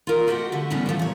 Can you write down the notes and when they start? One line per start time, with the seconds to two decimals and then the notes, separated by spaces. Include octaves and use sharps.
0.07 F4 A#4
0.27 A3 F#4 G4 D#5 F#5
0.52 D3 E5
0.70 D2 A2 G3 B3 C#4
0.86 D3 E3 F3 A3
0.99 A#2 C#5